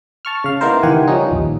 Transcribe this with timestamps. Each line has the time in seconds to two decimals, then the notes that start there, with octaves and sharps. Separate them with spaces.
0.25 A5 C#6 F6
0.44 C#3 F5
0.61 A#3 B3 D#4 E4 A#4 C5
0.83 C#2 D#3 E3 G4 F#5 G#5
1.07 F3 G3 C#4 D#4
1.31 A#1 D#2